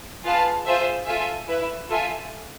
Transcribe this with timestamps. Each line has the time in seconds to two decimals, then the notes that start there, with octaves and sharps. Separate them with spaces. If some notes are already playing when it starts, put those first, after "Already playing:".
0.25 F4 G#4 B4 F5 A5
0.65 F4 G#4 C5 E5
1.07 F4 A4 E5 G#5
1.48 E4 B4 E5
1.89 F4 A4 E5 G#5